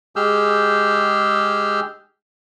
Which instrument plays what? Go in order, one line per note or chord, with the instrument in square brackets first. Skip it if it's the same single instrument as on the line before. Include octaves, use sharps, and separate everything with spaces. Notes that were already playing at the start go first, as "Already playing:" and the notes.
[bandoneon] G#3 G4 G#4 E6 F6 G6